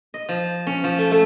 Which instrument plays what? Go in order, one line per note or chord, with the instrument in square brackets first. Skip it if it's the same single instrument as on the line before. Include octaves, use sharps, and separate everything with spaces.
[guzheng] D#5
F3
C#4
F3
A3
A3